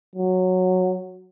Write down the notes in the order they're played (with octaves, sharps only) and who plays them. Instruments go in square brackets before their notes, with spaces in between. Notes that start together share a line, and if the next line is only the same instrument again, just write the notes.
[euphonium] F#3